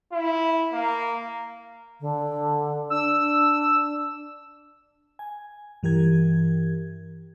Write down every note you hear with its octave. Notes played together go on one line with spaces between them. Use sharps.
E4
A#3
D3
D4 E6
G#5
G2 E3 G4 A#4 G#6